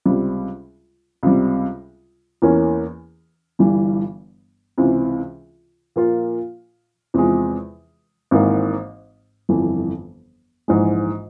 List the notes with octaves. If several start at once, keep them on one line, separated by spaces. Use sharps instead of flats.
C#2 C3 G3
C#2 C3 G3
E2 E3 A#3 C#4
G1 G2 E3 G3
C#2 C3 E3
A#2 F3 A#3 F4
E2 C3 F3 G#3
G#1 G#2 E3 A#3
G1 F2 E3
A#1 G#2 E3 G#3